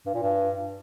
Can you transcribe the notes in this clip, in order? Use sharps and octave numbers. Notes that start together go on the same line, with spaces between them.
G2
A#2
G2